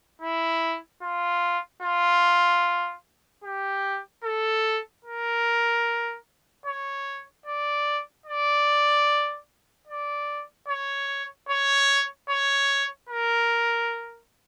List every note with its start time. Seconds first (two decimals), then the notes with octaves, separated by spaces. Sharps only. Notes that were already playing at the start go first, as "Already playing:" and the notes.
0.22 E4
1.02 F4
1.83 F4
3.44 G4
4.24 A4
5.05 A#4
6.66 C#5
7.46 D5
8.26 D5
9.87 D5
10.68 C#5
11.49 C#5
12.30 C#5
13.09 A#4